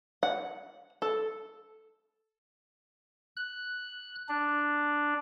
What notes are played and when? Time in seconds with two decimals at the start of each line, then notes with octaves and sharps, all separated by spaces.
0.23 F#5
1.02 A4
3.37 F#6
4.29 D4